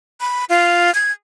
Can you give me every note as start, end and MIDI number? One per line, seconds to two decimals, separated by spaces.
0.21 0.45 83
0.49 0.93 65
0.95 1.12 92